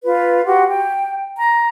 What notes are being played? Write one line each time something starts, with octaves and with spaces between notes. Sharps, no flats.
F4 B4
F#4 G4 F#5 C6
G5
A#5